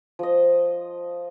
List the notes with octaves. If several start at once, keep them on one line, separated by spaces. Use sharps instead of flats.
F3 D#5